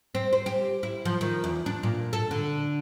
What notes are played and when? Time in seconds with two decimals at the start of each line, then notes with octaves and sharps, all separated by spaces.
0.15 C4
0.33 C5
0.46 G4
0.83 E4
1.05 F3
1.21 D#3
1.44 E2
1.66 D4
1.83 A#2
2.13 A4
2.31 D3